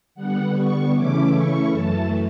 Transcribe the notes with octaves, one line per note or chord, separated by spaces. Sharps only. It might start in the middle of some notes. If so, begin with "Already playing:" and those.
D3 G3 B3 F#5
C#6
C#3 E3 A3 C#4 E4 D6
C#6
F#2 E3 A3 A5